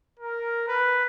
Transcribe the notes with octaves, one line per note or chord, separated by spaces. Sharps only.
A#4
B4